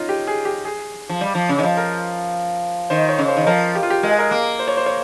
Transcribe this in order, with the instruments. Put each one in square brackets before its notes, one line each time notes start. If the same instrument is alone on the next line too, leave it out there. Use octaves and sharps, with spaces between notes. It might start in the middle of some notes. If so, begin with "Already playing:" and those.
Already playing: [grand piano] C#4 D#4 F4
G4
G#4
G4
G#4
[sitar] F3
G3
F3
C#3
D#3
F3
[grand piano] A#4
[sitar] D#3 [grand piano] C5
[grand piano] C#5
[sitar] C#3
[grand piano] C5
[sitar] D#3
[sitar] F3 [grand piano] A#4
[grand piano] G4
F4
G4
[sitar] G#3 [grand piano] A#4
[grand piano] G#4
A#4
[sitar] A#3
[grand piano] C5
C#5
C5
C#5